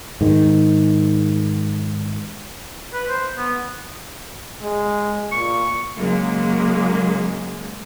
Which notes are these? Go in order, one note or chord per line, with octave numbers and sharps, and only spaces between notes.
G#2 D#3
B4
C5
B3
G#3
A#2 C#6
C#3 F#3 G#3 A#3